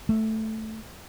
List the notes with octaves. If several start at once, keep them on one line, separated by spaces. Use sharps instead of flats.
A3